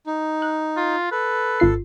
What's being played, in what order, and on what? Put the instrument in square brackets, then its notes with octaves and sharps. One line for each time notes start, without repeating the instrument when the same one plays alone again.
[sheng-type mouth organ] D#4
[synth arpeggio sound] F#6
[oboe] F4
[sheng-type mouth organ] A4 [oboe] B4
[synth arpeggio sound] G#1 F4 C7